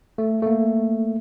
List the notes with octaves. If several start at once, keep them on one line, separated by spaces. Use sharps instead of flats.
A3
A3 A#3